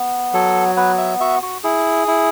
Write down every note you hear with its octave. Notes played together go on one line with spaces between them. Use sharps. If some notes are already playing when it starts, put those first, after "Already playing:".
Already playing: B3
F#3 A4
B3 B4
E5
F#4 E5
F#4
E4 G#4
E4